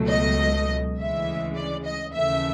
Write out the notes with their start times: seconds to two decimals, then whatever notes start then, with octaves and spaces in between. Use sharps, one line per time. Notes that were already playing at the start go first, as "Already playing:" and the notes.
Already playing: C#2 B2 F#3 A3
0.10 D#5
0.97 D2 C#3 E3 G#3 E5
1.55 D5
1.84 D#5
2.13 D#2 C#3 E3 A3 E5